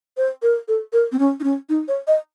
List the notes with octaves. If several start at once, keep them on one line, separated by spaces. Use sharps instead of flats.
C5
A#4
A4
A#4
C4
C#4
D#4
C#4
D#4
C#5
D#5